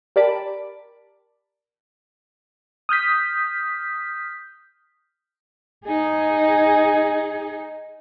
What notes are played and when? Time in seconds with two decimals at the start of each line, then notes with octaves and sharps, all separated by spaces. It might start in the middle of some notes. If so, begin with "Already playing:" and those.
0.16 G4 A#4 D5 A5 B5 D6
2.89 D#6 F6 G6 B6
5.85 D#4 G#4